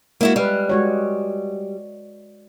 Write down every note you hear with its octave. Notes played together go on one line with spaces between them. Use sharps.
G#3 A#3 E4 F#4
G3 B4 F5
G#3 F#4 C#5